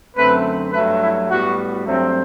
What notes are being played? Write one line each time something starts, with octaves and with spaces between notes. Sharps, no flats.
F#2 D3 A3 C4 B4
G2 F#3 A3 B4
E4
A2 G3 B3 F#4
G2 F#3 A3 C4